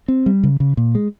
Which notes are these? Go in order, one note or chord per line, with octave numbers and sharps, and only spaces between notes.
C4
G3
C#3
C#3
A#2
G#3